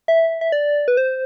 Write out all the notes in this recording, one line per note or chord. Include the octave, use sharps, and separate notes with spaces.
E5
E5
D5
B4
C5